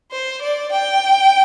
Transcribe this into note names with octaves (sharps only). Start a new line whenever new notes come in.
C5
D5
G5